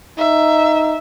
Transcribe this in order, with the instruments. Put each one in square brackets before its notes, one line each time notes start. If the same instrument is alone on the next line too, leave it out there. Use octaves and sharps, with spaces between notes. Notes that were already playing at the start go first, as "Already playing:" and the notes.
[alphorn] D#4 [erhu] E5